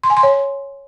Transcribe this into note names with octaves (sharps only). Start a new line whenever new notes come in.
C6
G#5
C6
C#5